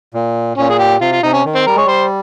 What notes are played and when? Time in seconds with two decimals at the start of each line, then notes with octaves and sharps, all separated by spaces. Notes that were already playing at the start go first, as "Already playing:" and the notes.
0.14 A#2
0.58 A#2 C#4
0.70 G#4
0.79 G4
1.01 C3 F4
1.12 F4
1.23 C3 D#4
1.34 C#4
1.45 D#3
1.56 C4
1.67 G3 A#4
1.75 G#3 C#5
1.85 G3 C5